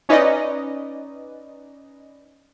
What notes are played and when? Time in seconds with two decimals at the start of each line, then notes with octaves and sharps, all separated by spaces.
0.09 C#4 D#4 B4 D5 D#5